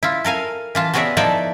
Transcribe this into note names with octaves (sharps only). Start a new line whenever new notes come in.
E4 F4
A4 A#4 F5 G#5
E3 F4 A5
B3 F#4 G#4 C#5 D5 E5
F3 D#4 E4 A4 D5 E5